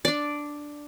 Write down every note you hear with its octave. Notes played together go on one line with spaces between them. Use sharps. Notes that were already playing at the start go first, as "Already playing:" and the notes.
D4 D5